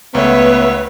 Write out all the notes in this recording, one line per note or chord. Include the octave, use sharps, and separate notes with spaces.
C#2 A3 B3 B4 C#5 E5